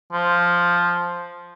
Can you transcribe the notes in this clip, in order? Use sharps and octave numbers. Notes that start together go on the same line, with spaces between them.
F3